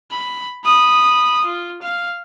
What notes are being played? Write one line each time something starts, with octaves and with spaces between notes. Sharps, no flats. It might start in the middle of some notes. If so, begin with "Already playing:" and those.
B5
B5 D#6
F4
F5